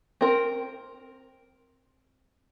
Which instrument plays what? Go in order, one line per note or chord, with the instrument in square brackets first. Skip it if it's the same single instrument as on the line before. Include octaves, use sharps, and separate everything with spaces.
[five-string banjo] C4 A#4